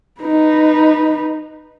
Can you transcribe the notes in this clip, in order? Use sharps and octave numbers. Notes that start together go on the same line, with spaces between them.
D#4 B4